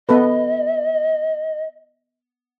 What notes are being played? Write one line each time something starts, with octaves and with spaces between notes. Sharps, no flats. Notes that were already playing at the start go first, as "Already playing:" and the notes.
B3 A4 B4 D#5